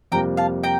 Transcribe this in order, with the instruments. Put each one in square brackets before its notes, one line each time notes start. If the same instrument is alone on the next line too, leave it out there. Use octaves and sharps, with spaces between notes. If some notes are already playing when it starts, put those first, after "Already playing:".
[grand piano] F2 C3 G3 A#3 [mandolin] G5 A#5
[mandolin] F5 A5
G5 A#5